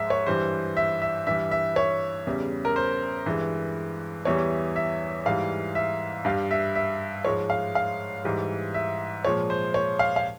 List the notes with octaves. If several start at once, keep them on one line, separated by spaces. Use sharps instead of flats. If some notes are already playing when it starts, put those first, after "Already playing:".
Already playing: G#2 F3 G#3 E5
C#5
G2 E3 G3 C5
E5
E5
G2 E3 G3 E5
E5
C#5
E2 C#3 G3
A#4
C5
G2 E3 G#3
E2 E3 G3 C#5
E5
G#2 E3 G3 F5
E5
G2 G3 F5
E5
E5
G#2 F3 G#3 C#5
F5
F5
G#2 E3 G3
E5
A#2 F3 G#3 C#5
C5
C#5
F5
F5